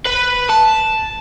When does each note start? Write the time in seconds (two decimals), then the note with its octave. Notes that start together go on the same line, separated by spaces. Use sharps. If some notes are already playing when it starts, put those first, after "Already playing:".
0.05 B4
0.49 A5